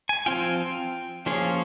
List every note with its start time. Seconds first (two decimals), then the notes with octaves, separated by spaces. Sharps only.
0.09 G#5
0.26 F3 C4 F4 G5
1.26 F3 A#3 C#4 F4 G#4